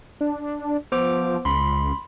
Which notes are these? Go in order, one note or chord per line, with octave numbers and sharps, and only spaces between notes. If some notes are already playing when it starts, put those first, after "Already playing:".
D4
F3 B3 C5 D6
C#2 B5 C6